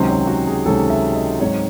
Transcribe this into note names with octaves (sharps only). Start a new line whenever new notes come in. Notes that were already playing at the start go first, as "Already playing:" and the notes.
Already playing: C#2 C3 D#3 F#3 C#4 C5
C#5
F#4
G#4
C#2 C3 D#3 F#3 C#4 A4
E5
D#5
G#2 F#3 C4 D#4 C#5